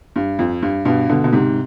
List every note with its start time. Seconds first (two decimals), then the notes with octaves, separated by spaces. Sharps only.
0.16 G2
0.39 F2
0.62 G2
0.85 G2 B2
1.09 B2 D3
1.24 B2
1.33 G#2 C3